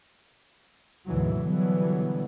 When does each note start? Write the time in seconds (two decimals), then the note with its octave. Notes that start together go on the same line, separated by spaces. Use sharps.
1.06 D2 G#2 B2 E3 F#3
1.41 B2 D3 E3 F#3 G3 B3